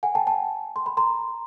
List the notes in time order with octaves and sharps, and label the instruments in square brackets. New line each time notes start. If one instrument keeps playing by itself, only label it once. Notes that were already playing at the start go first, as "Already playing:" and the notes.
[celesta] F#5 G#5
G5 A5
G5 A5
C6
B5
A#5 C6